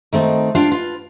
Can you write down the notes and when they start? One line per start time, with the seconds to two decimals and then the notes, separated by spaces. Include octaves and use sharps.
0.13 D#3 A3 C4 D#4
0.55 D4 F4 F5 G5
0.71 F4 B4